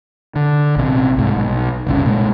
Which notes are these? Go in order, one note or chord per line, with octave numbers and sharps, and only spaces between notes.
D3
A#1 C3
C2 G#2
B1
F#1 C2 C#3
A#2 G#3